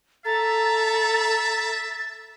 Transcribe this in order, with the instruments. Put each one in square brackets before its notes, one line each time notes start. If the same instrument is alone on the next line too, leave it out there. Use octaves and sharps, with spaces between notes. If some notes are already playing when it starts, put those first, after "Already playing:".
[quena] A4 [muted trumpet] E5 [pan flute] A#5 [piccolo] A6